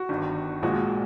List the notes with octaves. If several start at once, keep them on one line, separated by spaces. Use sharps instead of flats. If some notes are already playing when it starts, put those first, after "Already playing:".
Already playing: F#4
G1 G2 D#3
A#1 A#2 F3 G#3 F#4